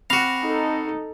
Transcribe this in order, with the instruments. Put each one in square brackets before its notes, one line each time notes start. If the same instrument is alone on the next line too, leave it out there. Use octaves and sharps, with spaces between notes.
[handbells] C4 B5 A#6 [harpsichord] F#4 F5
[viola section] D#4 A4